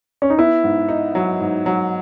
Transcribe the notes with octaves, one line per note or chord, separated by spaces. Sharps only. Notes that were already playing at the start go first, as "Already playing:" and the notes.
C#4
D#4
B3 E4
G#2
D#4
F#3
G#2
F#3